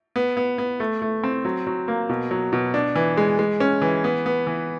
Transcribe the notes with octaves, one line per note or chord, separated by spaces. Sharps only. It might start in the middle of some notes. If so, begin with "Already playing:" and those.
B3
B3
B3
A3
A3
C4
F#3
F#3
A#3
B2
F#3
B2
D4
E3
G#3
G#3
C#4
E3
B3
B3
E3